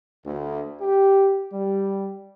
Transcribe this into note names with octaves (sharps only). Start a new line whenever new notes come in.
D2
G4
G3